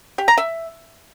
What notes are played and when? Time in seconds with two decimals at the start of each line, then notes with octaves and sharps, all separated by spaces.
0.18 G4
0.28 A#5
0.38 E5